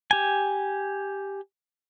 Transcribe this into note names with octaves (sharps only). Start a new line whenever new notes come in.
G4 G#5